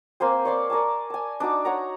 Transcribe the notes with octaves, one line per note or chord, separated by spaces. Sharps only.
A#3 C4 C5 G#5
C#5 D5 C6 D6
A#4 D5 G#5 A5
G#5 A5
D4 D#4 F#4 D6
C#5 F#5 A#5